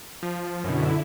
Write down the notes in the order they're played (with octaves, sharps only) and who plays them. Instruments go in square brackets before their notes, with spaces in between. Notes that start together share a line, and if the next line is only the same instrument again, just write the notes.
[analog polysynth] F3
[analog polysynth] F#2 B2 [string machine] D3 E4